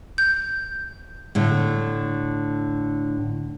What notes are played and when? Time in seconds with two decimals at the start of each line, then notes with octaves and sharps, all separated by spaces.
0.18 G6
1.35 A2 D3 A3